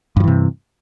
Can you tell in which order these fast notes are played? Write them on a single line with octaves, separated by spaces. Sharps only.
G2 F3 E3 C3